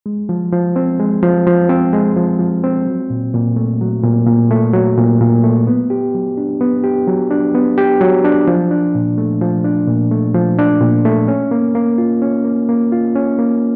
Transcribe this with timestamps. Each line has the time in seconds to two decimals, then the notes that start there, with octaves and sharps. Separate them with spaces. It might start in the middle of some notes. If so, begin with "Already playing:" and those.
0.06 G#3
0.29 F3
0.52 F3
0.76 C4
1.00 G#3
1.23 F3
1.47 F3
1.69 C4
1.93 G#3
2.17 F3
2.39 F3
2.64 C4
2.87 F#3
3.10 A#2
3.34 A#2
3.56 A3
3.81 F#3
4.03 A#2
4.27 A#2
4.51 A3
4.73 F#3
4.97 A#2
5.21 A#2
5.44 A3
5.67 B3
5.90 G4
6.14 F#3
6.37 D4
6.61 B3
6.84 G4
7.08 F#3
7.31 D4
7.54 B3
7.78 G4
8.01 F#3
8.24 D4
8.47 F3
8.71 D4
8.95 A#2
9.18 A3
9.41 F3
9.64 D4
9.88 A#2
10.11 A3
10.35 F3
10.59 D4
10.81 A#2
11.05 A3
11.28 C#4
11.51 A#3
11.75 A#3
11.98 F4
12.22 C#4
12.45 A#3
12.69 A#3
12.92 F4
13.15 C#4
13.39 A#3